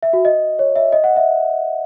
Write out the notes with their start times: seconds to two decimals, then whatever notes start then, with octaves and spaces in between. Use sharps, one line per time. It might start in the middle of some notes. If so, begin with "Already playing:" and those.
0.03 E5
0.13 F#4
0.25 D#5
0.59 C#5
0.76 E5
0.92 D#5
1.04 F#5
1.16 E5